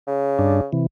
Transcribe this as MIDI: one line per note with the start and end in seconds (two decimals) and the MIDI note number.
0.07 0.69 49
0.39 0.61 43
0.39 0.61 62
0.73 0.86 48
0.73 0.86 52